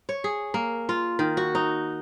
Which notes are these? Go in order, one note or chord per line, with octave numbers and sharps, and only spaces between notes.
C#5
G#4
A#3
F4
D#3
F#4
D#4